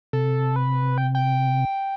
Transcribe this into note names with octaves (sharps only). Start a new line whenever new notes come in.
C3 A4
B4
G5
G5